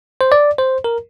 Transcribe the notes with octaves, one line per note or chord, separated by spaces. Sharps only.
C5
D5
C5
A#4